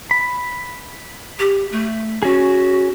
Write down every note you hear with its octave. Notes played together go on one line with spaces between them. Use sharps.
B5
G4
A3
C#4 F#4 G#4